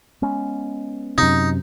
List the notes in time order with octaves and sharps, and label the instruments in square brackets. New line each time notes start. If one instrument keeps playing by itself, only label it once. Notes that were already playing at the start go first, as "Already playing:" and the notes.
[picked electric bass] G#3 B3 C#4
[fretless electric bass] F#2 C3 [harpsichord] D#4